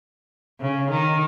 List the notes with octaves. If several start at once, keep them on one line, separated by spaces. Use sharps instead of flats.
C#3
D#3